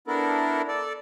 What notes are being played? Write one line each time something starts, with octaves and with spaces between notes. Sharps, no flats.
B3 D4 E4 A4 A#4
A4 D5